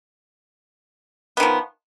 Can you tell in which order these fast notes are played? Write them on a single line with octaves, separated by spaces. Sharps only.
B3 D#3 F3